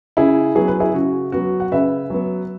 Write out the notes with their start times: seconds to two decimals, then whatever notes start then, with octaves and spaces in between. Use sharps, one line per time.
0.17 C#3 E4 G#4
0.55 F#3 B3 G#4
0.68 B4
0.80 E4 G#4
0.94 C#3 F#4
1.32 F#3 B3 F#4
1.60 F#5
1.72 C#3 B4 E5
2.10 F#3 B3